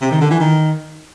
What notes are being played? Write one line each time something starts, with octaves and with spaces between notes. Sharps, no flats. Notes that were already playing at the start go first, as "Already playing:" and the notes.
C3
D#3
D3
E3
D#3